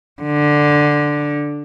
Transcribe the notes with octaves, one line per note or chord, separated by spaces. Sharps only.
D3